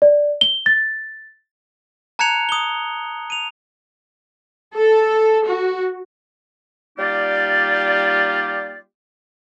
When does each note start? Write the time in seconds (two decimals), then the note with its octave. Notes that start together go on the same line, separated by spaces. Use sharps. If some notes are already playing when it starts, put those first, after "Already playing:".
0.02 D5
0.41 G7
0.66 A6
2.19 A5 A#5 F#6 G#6 C#7 F7
2.49 D#6 G7
3.30 D#7 F7
4.74 A4
5.45 F#4
6.98 G3 A#3 D#4 F4 G4 D5